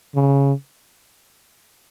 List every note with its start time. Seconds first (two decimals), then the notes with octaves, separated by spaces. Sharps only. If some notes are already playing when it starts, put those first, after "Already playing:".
0.15 C#3